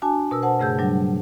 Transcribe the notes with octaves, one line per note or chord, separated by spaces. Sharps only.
D4 F#4 G#5 A5
B2 A#4 E6
C5 F#5 A5
G2 C#3 A3 G#4 E6 G6
F#3 G3 D4